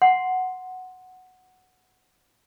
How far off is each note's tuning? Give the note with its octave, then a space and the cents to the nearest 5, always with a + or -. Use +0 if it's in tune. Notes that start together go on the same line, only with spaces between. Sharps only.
F#5 +0 C6 +0